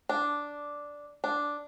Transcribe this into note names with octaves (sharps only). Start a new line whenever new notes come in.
D4
D4